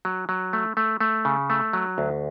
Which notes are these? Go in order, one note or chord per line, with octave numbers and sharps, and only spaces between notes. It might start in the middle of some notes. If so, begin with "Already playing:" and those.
F#3
F#3
A3
A3
A3
C#3
A3
F#3
D2